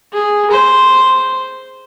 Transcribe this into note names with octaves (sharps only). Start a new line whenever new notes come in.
G#4
C5